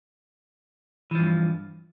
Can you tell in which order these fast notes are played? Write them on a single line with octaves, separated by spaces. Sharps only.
E3 F3 G2